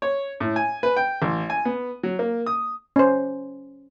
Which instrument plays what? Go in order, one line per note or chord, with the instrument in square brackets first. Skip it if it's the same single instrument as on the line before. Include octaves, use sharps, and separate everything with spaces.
[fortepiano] C#5
A2
G#5
B4
G5
A1
G#5
B3
F#3
A#3
D#6
[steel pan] C#4 C5